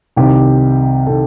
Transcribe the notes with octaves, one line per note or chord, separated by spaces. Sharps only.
C2 C3 D#3 G4
C3 D#3 A4